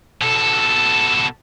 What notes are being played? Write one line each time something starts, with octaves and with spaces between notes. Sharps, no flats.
B2 A4